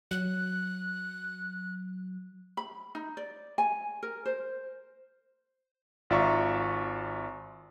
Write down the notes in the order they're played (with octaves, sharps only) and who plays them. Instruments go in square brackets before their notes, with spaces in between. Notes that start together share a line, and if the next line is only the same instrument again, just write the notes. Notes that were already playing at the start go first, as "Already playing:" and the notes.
[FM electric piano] F#3 [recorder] F#6
[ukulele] B5
D#4
D5
G#5
A#4
C5
[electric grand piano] G#1 F4 D5 E5 A#5 C#6